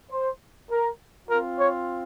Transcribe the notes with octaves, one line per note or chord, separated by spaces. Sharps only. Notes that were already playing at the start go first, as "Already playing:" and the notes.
C5
A#4
C4 F4 A#4
C#5